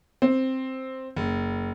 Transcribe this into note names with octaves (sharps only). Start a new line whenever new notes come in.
C4
F#1